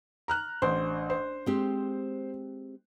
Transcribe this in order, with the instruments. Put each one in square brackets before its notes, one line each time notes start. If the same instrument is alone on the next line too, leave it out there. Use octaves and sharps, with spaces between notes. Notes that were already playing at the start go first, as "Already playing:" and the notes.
[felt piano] A#5 F6 F#6
[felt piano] A1 C5 [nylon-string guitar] D4
[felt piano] C5
[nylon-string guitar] G#3 C4 G4